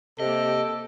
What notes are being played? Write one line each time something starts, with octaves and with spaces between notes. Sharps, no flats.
C3 A#3 G4 A4 D#5